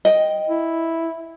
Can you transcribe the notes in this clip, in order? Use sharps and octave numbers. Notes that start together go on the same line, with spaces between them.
D#5 G5
E4